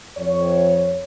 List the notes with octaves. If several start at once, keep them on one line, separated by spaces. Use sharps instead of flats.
F2 C#5